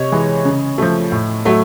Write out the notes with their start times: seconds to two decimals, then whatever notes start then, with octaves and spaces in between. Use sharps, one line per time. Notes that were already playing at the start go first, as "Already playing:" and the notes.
Already playing: C3 C#5 D#5
0.12 E3 G#3
0.45 C#3
0.78 F3 A3
1.12 A2
1.45 F#3 A3